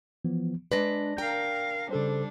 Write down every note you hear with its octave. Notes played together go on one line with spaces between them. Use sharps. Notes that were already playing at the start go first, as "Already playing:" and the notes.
E3 F3 B3
G#3 D4 B4 D5 A#6
A#4 F5 G5 A#5
C#3 G3 D4 A4 C5